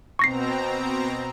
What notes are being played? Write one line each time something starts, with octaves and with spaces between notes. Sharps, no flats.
B2 C4 A#5 C#6 A#6 C7